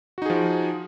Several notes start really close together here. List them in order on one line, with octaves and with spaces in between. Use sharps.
F#4 D#4 G#4 F3